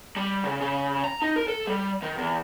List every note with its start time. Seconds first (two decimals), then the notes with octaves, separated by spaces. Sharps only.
0.16 G3
0.44 C#3
0.60 C#3
1.04 A#5
1.22 D#4
1.36 A#4
1.48 A4
1.67 G3
2.02 D#3
2.18 E2